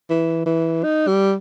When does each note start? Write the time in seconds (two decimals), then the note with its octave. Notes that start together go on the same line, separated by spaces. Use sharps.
0.10 E3
0.46 E3
0.84 D#4
1.08 G3